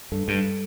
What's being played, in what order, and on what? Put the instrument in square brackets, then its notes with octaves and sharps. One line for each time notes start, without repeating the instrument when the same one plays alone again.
[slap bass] G2 [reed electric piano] A4
[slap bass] G2
[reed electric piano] G3